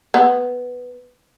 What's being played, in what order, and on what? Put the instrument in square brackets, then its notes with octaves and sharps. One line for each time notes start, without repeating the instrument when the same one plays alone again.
[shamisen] B3